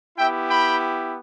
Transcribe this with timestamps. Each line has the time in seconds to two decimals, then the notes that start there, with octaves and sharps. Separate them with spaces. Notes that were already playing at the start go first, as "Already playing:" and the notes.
0.18 B3 E4 G4 E5 G5
0.49 G5 B5